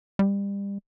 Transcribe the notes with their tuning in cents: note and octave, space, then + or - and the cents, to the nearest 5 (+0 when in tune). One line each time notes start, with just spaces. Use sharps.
G3 +30